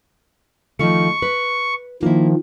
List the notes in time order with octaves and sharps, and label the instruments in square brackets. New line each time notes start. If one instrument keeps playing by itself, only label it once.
[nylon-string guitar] D#3 F3 A3 [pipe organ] C#6
[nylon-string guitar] B4
[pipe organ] D#3 F3 [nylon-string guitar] A#3 E4